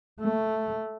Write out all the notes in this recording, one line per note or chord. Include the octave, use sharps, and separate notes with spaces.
A3